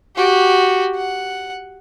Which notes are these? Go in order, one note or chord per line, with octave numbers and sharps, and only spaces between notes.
F#4 G4
F#5